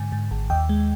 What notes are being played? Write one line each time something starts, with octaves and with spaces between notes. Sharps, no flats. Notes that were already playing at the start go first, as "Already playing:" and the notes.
Already playing: G#2 D3 G#5
G#2
G#1
D#2 G5
G#3